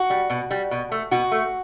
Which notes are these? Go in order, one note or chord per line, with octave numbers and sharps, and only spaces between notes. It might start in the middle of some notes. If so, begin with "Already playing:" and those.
Already playing: F#4
G3
B2
G3
B2
A3
B2 F#4
A3